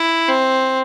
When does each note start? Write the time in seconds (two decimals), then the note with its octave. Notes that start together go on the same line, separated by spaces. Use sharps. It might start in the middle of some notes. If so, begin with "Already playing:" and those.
Already playing: E4
0.28 C4